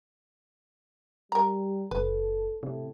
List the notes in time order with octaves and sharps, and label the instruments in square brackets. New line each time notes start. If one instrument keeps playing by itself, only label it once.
[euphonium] G3 [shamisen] A#4 A#5
[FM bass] F#1 [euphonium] A4 [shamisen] B4
[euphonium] A2 [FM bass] C3